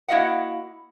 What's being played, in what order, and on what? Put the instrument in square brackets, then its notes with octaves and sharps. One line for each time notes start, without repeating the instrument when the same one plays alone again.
[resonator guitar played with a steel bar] A#3 E4 F#4 D#5 F5 F#5